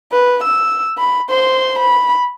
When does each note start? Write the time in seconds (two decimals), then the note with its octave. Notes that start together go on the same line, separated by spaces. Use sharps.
0.12 B4
0.44 E6
0.98 B5
1.30 C5 C6
1.79 B5